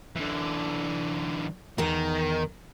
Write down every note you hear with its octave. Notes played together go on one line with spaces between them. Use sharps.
D3 E3
E2 D#3 A#4